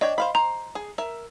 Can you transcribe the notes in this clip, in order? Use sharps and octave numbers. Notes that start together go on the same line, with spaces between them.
D4 C#5 D#5 G5
C5 F5 B5
C5 A#5
G#4
A#4 E5